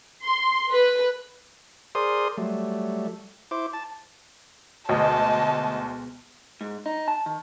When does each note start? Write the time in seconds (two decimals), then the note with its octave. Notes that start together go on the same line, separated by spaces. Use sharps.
0.25 C6
0.71 B4
1.95 G#4 A#4 C5 D5 C6 D#6
2.38 F#3 G3 A3
3.51 E4 C5 D6
3.73 A5
4.89 D2 B2 G#3 D#5 A5
6.61 G#2
6.86 D#4
7.08 A5
7.26 D#3